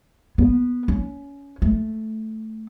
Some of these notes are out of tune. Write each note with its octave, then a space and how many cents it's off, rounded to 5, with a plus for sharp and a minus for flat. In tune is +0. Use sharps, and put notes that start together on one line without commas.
B3 -5
C#4 +20
A3 -5